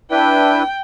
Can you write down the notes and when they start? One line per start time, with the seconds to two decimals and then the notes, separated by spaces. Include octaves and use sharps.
0.11 D4 E4 B4 G5